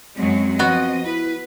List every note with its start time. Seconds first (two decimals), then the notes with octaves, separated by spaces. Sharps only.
0.16 F#2 F#3 G#3 C4
0.59 F3 B3 F#4 D#5
1.05 E4 B4